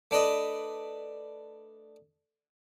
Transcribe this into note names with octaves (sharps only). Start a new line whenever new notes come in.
A3 D4 B4 D#5